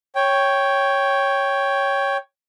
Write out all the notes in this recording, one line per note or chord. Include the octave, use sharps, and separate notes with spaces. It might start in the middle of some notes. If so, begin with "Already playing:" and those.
C#5 G5